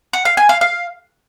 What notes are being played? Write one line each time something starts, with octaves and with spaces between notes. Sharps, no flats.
F#5
F5
G#5
F5
F5